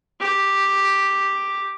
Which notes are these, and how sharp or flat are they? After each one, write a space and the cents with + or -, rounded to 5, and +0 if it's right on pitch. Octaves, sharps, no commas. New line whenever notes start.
G4 +0